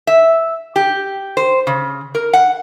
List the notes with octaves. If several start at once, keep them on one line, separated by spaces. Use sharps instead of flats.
E5
G4
C5
C#3
A#4
F#5